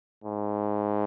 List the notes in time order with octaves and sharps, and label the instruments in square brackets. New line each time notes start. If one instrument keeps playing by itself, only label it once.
[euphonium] G#2